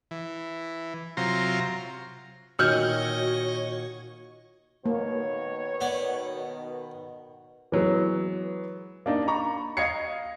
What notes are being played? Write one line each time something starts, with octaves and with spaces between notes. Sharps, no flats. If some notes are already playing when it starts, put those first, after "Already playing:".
E3
C3 F#3 F4 A#5 C6
A#2 D#3 F#4 C#5 D#5 E6 F6 G6
B2 D#3 A#3 C#5
B3 D5
E3 F#3 G#3 B3
A#3 D4 D#4
A#5 B5 C#6
D#5 F5 G#6 C7 C#7